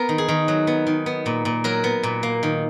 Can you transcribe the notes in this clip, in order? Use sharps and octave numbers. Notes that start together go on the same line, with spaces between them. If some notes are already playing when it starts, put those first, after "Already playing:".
Already playing: B3 A#4
D#3
G#4
D#3
F#3
B3
D#3
B3
A#2
A#2
F#3 A#4
B3
A#2
A#3
D#3